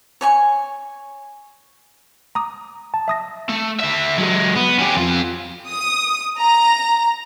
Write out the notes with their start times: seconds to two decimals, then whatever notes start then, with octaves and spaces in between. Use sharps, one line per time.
0.21 C#5 G#5 C#6
2.35 A#5 D6 D#6
2.94 A5
3.08 E5 D#6 A#6
3.49 A3
3.79 D3 E5
4.18 F#3 G#3
4.56 B3
4.79 C#4 G4
4.96 F2 F4
5.68 D#6
6.38 A#5